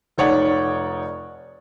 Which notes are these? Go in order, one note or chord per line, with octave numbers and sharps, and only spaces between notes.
F1 D#4 C#5 D5 F#5